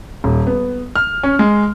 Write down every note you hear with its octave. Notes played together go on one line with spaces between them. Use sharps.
D#1
B3
F6
C#4
G#3